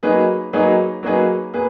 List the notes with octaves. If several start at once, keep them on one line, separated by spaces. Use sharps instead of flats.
F#3 A#3 D#4 G#4 B4
F#3 A#3 D#4 G#4 B4
F#3 A#3 D#4 G#4 B4
A#3 G#4 B4